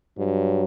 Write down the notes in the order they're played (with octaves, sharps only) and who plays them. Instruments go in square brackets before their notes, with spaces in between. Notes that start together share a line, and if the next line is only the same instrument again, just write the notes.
[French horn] G2 [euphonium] F#3